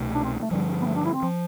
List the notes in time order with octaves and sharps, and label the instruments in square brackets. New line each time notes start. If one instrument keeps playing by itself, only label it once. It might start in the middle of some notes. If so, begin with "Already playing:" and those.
Already playing: [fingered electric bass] C2 B2 A3
[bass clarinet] D4
C4
A3
[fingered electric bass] G2 D3 F3 [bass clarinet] G3
[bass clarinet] B3
A3
D4
E4
C4
[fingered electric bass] F3